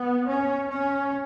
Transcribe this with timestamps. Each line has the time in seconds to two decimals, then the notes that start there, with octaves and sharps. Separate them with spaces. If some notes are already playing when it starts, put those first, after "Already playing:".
Already playing: B3
0.27 C#4
0.69 C#4